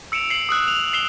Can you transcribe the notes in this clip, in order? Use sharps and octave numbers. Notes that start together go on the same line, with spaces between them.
E6 C#7 D7 E7 F7
C7 C#7 F#7
D#6 E6 F#6
F7
E6 C7 E7 F7 G7